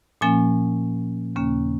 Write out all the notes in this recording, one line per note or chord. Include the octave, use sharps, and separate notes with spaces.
A#2 F3 A#3 C#4 G#5
D#2 C#3 A#3 C#4